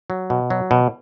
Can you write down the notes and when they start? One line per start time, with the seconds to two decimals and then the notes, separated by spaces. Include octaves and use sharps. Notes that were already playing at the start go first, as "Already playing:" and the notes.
0.10 F#3
0.30 B2
0.50 F#3
0.71 B2